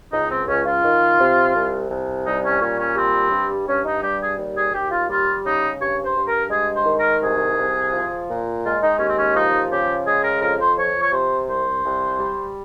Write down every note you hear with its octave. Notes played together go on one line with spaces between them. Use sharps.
C#2 D#4
C4
C#2 C#4
F4
D#3
C3
C2
C2
G3 D#4
C#4
A#2 C#4
C#4
G3 C4
G2
G2 C#4
D#4
G3 G4
G#4
D#2
G#4
D#2 G4
F4
G3 F4
C#3 D#4
G2 C#5
C5
G2
A#4
G#3 G#4
C5
D#3
A#4
C2 G#4
C2
F3
A#2
G#3 F4
D#4
D#2 C#4
C4
C#4
F3 D#4
C#3 G4
G#3 G#4
A#4
F2 A#4
C5
F3 C#5
C#5
C3 C5
C2 C5
C2
G3